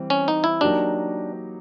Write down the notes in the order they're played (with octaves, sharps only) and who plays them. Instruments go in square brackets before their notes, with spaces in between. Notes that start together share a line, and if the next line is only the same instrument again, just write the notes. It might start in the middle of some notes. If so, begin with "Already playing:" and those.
Already playing: [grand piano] E3 G3 C4
[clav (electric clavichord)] C#4
D#4
E4
[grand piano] F#3 A#3 D#4 G4 [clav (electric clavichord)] D4